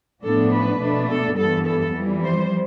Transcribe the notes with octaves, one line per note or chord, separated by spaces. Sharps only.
A2 F3 B3 D4 A4
B4
B2 A3 D4
A4
G2 E3 G3 B3 A4
A4
F2 E3 G3
C5